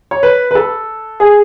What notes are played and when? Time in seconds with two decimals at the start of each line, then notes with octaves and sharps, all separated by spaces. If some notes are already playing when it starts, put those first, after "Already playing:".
0.11 C#5
0.23 B4
0.51 B4
0.55 A4
1.20 G#4